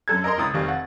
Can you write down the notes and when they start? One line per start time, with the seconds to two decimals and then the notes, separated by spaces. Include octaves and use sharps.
0.08 F#2 A4 G#6
0.24 A#4 D#5 A#5 C6
0.38 C#2 E4 D#6 A6
0.54 F1 D#3 G3 F5 C#6
0.68 F#5